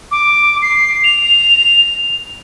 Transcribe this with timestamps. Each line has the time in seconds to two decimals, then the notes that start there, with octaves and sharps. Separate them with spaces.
0.11 D6
0.62 C7
1.04 F7